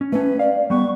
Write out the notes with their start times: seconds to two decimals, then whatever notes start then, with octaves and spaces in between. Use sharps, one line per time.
0.01 C#4
0.12 A3 C#4 B4
0.39 D5 F5
0.70 G3 B3 C#6